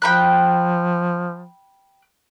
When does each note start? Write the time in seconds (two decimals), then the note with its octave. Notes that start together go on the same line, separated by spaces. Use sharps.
0.02 F3 G5 B5 F#6